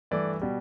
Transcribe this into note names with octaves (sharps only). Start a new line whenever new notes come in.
G2 E3 A3 D5
B2 G3